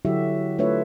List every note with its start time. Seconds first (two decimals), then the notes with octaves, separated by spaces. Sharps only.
0.05 D3 F#3 E4 F#4 G4 E5
0.58 A3 D4 F4 B4 C#5 E5